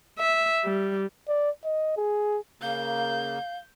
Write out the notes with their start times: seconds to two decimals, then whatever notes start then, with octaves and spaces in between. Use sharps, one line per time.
0.19 E5
0.64 G3
1.28 D5
1.64 D#5
1.97 G#4
2.62 C#3 A#3 F5 G6